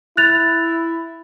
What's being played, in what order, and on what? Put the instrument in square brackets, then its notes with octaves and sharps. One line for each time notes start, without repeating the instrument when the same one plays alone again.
[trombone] E4 [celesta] F#6 A6 F7